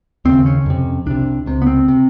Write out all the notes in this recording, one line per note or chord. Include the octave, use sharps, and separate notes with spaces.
D#2 C#3 C4
C#4
F2 C3
C2 C3 D4
C#2 C3
B3
C4
C3